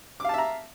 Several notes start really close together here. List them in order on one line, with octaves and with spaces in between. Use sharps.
D6 F5 A5 E5 A#5